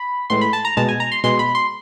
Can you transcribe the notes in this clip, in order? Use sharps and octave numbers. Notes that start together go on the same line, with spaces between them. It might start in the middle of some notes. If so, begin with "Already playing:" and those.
Already playing: B5
A2 E3 G#3 C6
B5
A5
A#5
B2 G#3 A5
G#5
A#5
C6
B2 G#3 C6
B5
C6